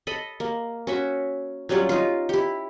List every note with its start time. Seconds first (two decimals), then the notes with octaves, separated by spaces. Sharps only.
0.07 A4 D#5 B5
0.40 A#3
0.87 C#4 F#4 E5
1.69 F#3 G3 C#4 F4
1.89 D#4 F4
2.29 E4 G4